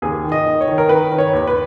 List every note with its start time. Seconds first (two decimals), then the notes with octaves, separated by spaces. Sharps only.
0.02 D#2 G#4
0.24 D#3
0.32 D#5
0.46 D#3
0.61 C#5
0.68 D#3
0.78 A#4
0.89 D#3 B4
1.11 D#3
1.18 C#5
1.33 D#2
1.47 B4